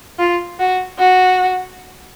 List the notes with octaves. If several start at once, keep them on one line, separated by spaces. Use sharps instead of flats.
F4
F#4
F#4